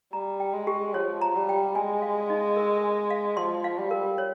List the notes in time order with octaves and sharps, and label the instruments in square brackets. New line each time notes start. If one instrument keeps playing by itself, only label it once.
[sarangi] G3 [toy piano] A#5
[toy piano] G5
[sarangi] G#3
[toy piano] G4
[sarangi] F3 [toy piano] C#5
[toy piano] A#5
[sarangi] G3
[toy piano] G5
[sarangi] G#3 [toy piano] G#5
[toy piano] F5
D#4
A#4
G#5
F5
[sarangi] F3 [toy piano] C6
[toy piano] F5
[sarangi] G3
[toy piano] A#4
C#5